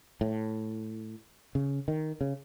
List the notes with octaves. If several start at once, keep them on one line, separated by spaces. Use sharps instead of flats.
A2
C#3
D#3
C#3